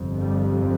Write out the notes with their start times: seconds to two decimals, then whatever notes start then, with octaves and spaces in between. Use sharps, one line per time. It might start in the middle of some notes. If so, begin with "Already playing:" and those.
Already playing: G1 F2 C3
0.20 G3